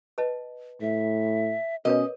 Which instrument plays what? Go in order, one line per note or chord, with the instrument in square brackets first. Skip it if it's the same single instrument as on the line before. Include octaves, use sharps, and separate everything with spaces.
[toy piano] B4 D#5 A5
[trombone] A2 [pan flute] E5
[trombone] B2 [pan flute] C#4 [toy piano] A#4 B4 C#5 [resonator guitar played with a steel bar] D#5